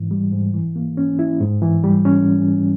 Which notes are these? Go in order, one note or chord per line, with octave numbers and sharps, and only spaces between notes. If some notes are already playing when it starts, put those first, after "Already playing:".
Already playing: G#2 E3
G3
G#2
E3
A#3
C#4
E4
G#2
E3
G3
C#4